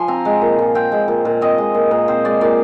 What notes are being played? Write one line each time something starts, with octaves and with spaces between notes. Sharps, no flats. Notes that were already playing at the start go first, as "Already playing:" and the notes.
Already playing: F3 G#5 C6
C4 A#5
G#3
A#2
A#2
C4 G5
G#3
A#2
A#2
C4 D#5
G#3
A#2
A#2
C4 C5
G#3 D5
A#2 D5